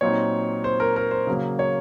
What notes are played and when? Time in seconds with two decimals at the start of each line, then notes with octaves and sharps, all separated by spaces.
0.01 A#2 F#3 C4 D#4 C#5
0.64 C5
0.80 A#4
0.96 A#4
1.11 C5
1.27 C#3 F#3 A#3
1.59 C#5